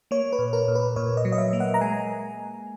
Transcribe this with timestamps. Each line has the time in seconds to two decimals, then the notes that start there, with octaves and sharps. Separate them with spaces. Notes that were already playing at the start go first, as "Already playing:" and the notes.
0.11 A#3 C#5
0.32 B4
0.39 A#2
0.53 A#4
0.68 A#2
0.75 B4
0.96 A#2 C#5
1.17 D#5
1.25 F#3
1.32 D#5
1.38 E5
1.53 A#3
1.60 F#5
1.74 A#5
1.81 G#3 G#5